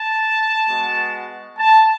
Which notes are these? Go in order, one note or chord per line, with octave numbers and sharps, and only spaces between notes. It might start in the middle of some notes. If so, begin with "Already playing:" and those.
Already playing: A5
G#3 B3 F#4
A5